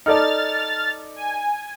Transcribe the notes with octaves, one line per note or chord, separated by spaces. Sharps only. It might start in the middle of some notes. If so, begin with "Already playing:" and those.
D#4 A4 D5 F6 A6
G#5